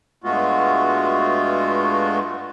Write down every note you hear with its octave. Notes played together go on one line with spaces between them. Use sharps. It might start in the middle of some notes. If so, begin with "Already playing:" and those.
G2 G#3 A3 B3 F4 F#4